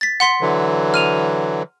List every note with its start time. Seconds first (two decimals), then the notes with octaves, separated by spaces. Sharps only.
0.01 A6 B6
0.20 F#5 C6 B6
0.41 D3 E3 F#3
0.94 F6 D#7 F7